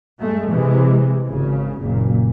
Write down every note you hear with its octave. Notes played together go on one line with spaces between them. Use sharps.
G2 G#3 A3
C3 E3 G#3
G#1 C#3
F#1 A#2